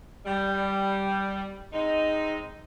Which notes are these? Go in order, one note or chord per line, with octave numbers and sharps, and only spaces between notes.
G3
G#3 C4 D#4